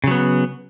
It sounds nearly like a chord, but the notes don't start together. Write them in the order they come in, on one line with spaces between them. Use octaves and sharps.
C#3 F#3 B3